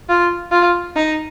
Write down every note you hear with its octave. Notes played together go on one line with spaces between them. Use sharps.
F4
F4
D#4